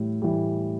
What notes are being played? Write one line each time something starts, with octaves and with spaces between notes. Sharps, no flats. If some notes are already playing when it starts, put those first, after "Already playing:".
Already playing: A2 E3 G3
A2 E3 G3